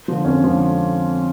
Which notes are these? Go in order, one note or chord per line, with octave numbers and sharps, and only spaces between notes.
D3 F3
F2 C#4
D3 F3